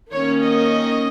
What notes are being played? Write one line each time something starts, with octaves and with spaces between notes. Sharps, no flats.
D#3 A#3 C#4 C#5
D#5